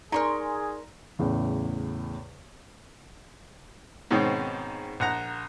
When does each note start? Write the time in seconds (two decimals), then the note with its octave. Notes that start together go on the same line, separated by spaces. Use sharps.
0.12 D#4 G#4 A#4 D5 A#5 C6 C#6
1.19 E2 A2 C#3
4.11 G#2 B2 D#3 C4 C#4
5.00 A#1 F#5 A#5